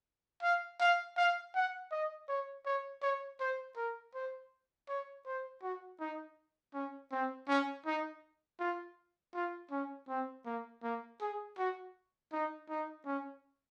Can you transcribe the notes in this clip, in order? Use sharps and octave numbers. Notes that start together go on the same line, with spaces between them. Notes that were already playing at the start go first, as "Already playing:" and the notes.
F5
F5
F5
F#5
D#5
C#5
C#5
C#5
C5
A#4
C5
C#5
C5
F#4
D#4
C#4
C4
C#4
D#4
F4
F4
C#4
C4
A#3
A#3
G#4
F#4
D#4
D#4
C#4